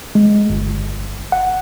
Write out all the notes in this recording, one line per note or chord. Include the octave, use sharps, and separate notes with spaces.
G#3
G1
F#5